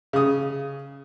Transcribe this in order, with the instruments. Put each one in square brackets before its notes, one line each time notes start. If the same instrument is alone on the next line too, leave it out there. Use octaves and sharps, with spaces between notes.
[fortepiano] C#3 D#6